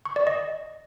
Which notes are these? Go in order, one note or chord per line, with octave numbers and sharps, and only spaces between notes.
C#6
D5
D#5